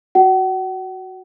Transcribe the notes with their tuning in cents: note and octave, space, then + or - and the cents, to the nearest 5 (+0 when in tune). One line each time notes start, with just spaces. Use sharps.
F#4 +0 F#5 +40